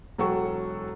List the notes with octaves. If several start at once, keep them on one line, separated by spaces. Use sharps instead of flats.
E1 F#3 A4 F#5 G5 C#6